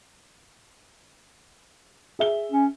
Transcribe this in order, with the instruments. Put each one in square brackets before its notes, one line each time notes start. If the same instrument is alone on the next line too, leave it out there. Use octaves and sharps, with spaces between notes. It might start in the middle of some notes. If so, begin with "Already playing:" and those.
[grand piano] G#4 E5 G7
[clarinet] C#4